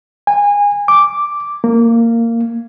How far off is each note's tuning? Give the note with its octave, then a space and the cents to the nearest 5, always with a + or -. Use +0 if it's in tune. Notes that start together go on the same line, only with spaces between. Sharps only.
G#5 -25
D6 +0
A#3 -15